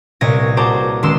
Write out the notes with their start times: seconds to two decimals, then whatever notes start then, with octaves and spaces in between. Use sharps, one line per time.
0.21 C2 A#2 C#5 D#5 G#6 A#6
0.57 F#4 G#4 C5 A5 A#5 D6
1.03 C#2 D#3 G#3 C6 E6